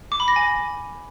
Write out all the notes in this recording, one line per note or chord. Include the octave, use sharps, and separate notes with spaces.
D6
B5
A#6
G#5